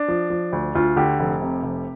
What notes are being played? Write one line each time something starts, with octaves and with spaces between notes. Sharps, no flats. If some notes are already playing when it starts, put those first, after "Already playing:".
Already playing: D4
F3
F3
D2
D2 F4
D3 G4
F1
C3
F1